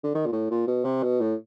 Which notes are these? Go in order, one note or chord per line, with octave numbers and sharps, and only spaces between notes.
D3
D#3
A#2
A2
A#2
B2
C3
B2
A2